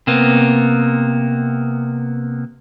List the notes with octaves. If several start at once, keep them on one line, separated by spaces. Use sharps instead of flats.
C3 A#3 B3